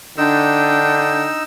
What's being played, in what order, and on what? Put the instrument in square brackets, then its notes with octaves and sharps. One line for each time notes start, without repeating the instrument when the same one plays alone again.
[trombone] D3 [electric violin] D4 G5 [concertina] D#4 E6